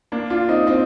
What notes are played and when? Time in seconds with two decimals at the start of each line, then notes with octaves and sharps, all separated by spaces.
0.12 A#3 D4
0.30 D4 F4
0.49 C4 D#4
0.67 C4 D#4